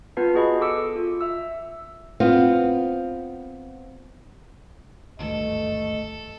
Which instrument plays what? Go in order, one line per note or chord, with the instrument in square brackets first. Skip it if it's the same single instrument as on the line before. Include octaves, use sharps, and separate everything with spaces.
[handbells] B3 F4 B4 A5 C7
F#4 G#4 D#5 B5
A4 D6 E6 C#7
F4
E5 E6
[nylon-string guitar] B3 C4 F4
[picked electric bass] G#1 D2 G2 [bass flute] A3 [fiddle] A4 [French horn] D#5